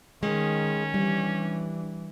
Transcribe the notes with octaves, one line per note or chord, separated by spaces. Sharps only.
D#3 G#3 C#4
E3 G3 D4